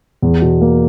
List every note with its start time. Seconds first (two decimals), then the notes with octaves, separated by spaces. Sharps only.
0.22 E2
0.42 B2
0.61 A#3